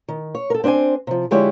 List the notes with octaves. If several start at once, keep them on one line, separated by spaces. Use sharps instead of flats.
D#3
C#5
A4 A#4
C4 D4 B4 C5 G#5
C3 F3
D3 F3 G#3 E4 G4 C#5